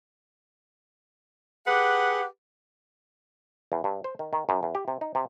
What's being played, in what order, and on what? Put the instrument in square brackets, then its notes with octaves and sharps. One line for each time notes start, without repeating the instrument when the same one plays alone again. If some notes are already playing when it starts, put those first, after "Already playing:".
[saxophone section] G4 G#4 B4 F#5
[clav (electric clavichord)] E2
G2
C5
D#3
D#3
F#2
E2
G4
C3
D#4
C3